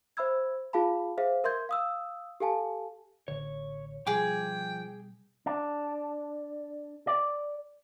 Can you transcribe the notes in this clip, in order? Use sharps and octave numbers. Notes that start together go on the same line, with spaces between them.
C5 E5 B5 E6 G#6
F4 G#4 F5 A5 B5
G#4 C5 E5 F5
A#4 E5 C6 G6 G#6
F5 D#6 E6
G4 A4 F5 G#5 A5
A1 D3 C#5
B2 F3 G3 G#4 G5 D6
D4
D5